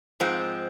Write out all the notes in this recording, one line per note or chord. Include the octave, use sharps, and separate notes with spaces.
G#2 F3 G#3 C4